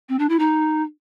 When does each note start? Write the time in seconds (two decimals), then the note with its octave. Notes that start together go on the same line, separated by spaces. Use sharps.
0.09 C4
0.19 D4
0.29 E4
0.39 D#4